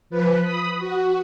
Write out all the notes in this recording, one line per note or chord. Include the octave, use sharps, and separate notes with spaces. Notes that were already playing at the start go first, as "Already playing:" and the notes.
F3 B4
B5 D#6
F#4